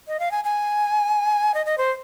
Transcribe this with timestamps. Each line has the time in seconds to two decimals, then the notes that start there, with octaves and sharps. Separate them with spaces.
0.08 D#5
0.20 F5
0.31 G#5
0.44 G#5
1.54 D#5
1.66 D#5
1.78 C5